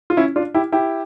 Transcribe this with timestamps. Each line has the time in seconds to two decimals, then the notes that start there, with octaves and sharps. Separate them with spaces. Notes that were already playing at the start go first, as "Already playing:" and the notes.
0.10 F4
0.17 C#4 E4
0.36 D4 F4
0.55 E4 G4
0.72 E4 G4